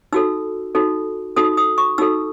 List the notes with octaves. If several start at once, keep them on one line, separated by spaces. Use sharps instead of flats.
D#4 F#4 A4 E6
D#4 F#4 A4
D#4 F#4 A4 D#6
D#6
C#6
D#4 F#4 A4 E6